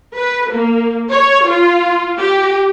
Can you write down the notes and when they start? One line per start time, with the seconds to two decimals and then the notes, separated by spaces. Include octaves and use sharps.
0.16 B4
0.51 A#3
1.13 C#5
1.47 F4
2.20 G4